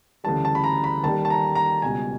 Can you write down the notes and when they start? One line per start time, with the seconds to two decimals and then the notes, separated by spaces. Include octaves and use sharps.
0.24 D2 C#3 E3 G3 A5
0.45 A5
0.55 B5
0.64 A#5
0.84 B5
1.03 D#2 D#3 G3 A5
1.25 A5
1.30 A#5
1.55 A#5
1.82 C#2 B2 G3 G#5